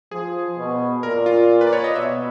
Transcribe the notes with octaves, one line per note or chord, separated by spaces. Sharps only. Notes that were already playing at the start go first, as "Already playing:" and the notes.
F3 G#4
B2
A#2 A#4
F4
B4
D5
C#5
D#5
B2 E5